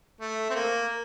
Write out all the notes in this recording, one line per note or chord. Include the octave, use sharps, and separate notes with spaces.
A3
C4
A#3